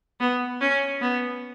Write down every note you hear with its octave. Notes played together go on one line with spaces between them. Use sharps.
B3
C#4
B3